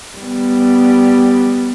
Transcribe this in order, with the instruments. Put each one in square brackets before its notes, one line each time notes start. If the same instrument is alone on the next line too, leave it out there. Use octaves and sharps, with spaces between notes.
[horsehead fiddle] G3 B3